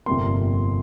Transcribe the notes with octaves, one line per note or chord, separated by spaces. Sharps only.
G1 F2 C3 G3 A#3 C6